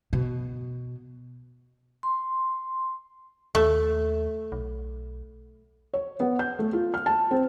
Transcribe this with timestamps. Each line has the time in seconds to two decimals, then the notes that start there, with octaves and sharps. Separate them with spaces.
0.13 B2
2.03 C6
3.55 D#2 A3
4.52 B1
5.93 C#5
6.20 B3
6.39 G6
6.59 A3
6.73 F4
6.94 F6
7.06 A5
7.31 C4